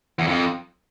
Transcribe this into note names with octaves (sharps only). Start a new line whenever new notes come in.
E2
F2